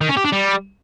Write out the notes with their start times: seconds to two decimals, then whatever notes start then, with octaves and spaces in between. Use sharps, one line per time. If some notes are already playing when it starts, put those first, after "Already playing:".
0.01 D#3
0.09 C#4
0.17 G4
0.25 D4
0.32 G3